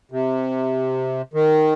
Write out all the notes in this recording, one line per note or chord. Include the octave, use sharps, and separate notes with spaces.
C3
D#3